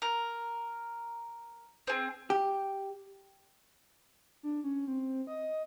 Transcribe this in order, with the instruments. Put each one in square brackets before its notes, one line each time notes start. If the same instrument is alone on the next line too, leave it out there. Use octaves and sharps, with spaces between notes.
[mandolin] A#4
C4 G#4
[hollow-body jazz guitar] G4
[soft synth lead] D4
C#4
C4
D#5